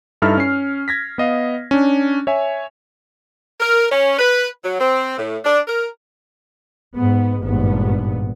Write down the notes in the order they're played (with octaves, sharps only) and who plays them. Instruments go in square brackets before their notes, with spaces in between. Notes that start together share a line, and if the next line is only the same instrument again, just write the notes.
[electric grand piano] G2 D#4 E4 A4 E5 F6
C#4 C7
G#6 A#6 B6
B3 D#5 F5
C#4 D4
C#5 E5 G#5
[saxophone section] A#4
C#4
B4
F#3
C4
A2
D4
A#4
[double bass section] G#2 B3
G#1 G2 A#2 B3